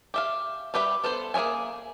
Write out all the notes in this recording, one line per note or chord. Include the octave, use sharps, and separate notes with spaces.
G4 E5 F5
G3 G4 B4 E5
B3 A4 B4 C5
A#3 G#4 C#5 E5 G#5